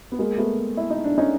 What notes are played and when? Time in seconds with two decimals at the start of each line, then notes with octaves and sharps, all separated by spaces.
0.12 B3
0.19 G#3 A#3
0.38 A3 B3
0.77 E4
0.90 D#4
1.04 D4
1.18 C#4 D#4